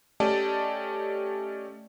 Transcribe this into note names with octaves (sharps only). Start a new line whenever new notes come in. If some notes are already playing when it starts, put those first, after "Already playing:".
A3 C#4 G4 D5 D#5 A5